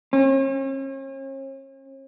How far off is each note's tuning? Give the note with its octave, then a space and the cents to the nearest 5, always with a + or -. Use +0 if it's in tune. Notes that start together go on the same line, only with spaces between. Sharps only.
C#4 -45